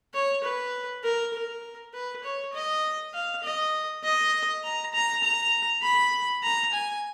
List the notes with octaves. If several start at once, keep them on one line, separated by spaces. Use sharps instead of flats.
C#5
B4
A#4
A#4
B4
C#5
D#5
F5
D#5
D#5
A#5
A#5
A#5
B5
A#5
G#5